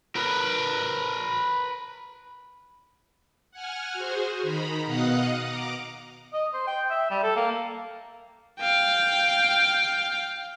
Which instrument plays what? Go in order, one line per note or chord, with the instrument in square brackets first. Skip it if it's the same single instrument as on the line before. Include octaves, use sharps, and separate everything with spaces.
[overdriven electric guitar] A#4 B4
[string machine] F#5 G#5 F6
F#4 G#4 C5
D#3 A#5 B5
B2 D#5 F5 F#5 D#6 F#6
A#5 D6
[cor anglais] D#5
C5
G5
E5
G3
A4
A#3
[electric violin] F5 G5